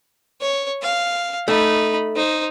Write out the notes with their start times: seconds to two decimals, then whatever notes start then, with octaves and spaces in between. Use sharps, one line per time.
0.41 C#5
0.82 F5
1.48 A3 D#4 B5
2.16 D#4 C5